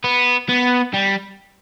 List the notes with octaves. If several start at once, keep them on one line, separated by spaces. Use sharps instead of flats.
B3
B3
G3